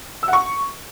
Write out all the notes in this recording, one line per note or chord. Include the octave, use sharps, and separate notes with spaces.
E6
F#5
C#6